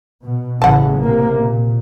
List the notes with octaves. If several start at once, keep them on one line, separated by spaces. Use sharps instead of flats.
B2
A1 C#3 E3 F#5 A5
C3 A#3
A#2